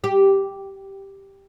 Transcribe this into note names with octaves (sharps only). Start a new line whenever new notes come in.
G4